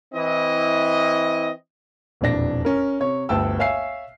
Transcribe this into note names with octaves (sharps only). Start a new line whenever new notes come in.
E3 C4 E4 D#5
E1 A#1 F2 D4 A#6
C#4 A#4
C3 C#5
G1 D2 G5 A5 E6
C#5 E5 F5 G#5 E6 C7